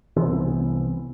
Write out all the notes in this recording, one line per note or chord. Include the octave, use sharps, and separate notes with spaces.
C2 E3 B3 C4